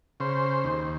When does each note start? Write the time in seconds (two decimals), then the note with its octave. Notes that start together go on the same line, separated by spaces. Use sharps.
0.20 C#3 C5
0.64 D#2